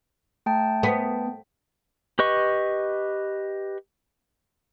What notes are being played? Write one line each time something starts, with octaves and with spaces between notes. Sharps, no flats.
A3 G5 A5
B3
G4 B4 D#5 C#6